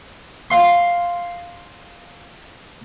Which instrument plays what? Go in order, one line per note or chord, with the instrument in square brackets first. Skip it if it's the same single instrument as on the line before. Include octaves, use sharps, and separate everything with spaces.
[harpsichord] F5 C6